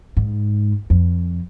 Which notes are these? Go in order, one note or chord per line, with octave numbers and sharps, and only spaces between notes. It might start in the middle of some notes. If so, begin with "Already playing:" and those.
G#2
F2